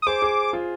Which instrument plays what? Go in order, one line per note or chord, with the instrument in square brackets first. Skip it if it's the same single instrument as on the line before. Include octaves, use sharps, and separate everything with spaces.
[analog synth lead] D#6
[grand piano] G#4 C5 [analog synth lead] D6
[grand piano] G#4 C5
F4 G#4